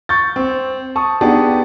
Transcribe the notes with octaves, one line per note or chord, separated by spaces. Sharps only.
C#6 G6 A6
C4
A5 C#6 D#6
B3 D4 D#4 G4 G#4 A5